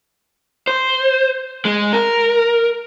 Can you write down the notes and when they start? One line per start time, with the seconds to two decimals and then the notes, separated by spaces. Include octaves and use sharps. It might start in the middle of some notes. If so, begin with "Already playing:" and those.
0.67 C5
1.65 G#3
1.93 A#4